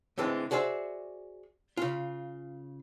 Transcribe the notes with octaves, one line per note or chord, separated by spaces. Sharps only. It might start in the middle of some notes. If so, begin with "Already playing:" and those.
A2 D3 E3 G#3 C4
F#4 G#4 C5 D5 E5
C#3 F4